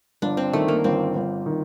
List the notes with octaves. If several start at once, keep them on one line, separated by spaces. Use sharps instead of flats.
G1 D4
C4
D#3 A3
A#3
G1 C4
G1
D#3